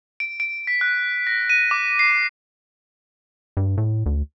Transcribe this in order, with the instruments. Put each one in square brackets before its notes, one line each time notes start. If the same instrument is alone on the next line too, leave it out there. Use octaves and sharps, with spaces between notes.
[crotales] D7
D7
B6
F#6
A#6
D#7
D6
C7
[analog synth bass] G2
A2
D2